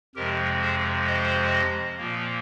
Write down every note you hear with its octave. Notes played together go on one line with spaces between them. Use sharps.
F2 C3 F3 G#3 G4 A#4
G#4 C5
C5 D#5
A#2 F3 A#3